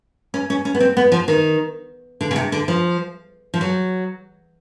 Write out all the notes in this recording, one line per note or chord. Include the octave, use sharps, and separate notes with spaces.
C#4
C#4
C#4
B3
C4
B3
F3
D#3
D3
C#3
C3
D3
F3
F3
F#3